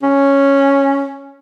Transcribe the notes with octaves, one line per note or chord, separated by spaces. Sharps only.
C#4